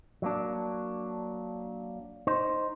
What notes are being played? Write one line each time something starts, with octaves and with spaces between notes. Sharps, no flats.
F#3 A#3 D4
D#4 C5